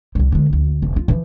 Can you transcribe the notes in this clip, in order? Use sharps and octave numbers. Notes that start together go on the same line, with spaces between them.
C2 G3
D3 G#3
F#1 D2
F1
F4
E3 F3